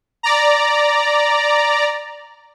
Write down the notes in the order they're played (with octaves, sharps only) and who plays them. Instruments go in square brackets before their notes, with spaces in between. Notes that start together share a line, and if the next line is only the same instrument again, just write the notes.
[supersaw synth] D5 A#5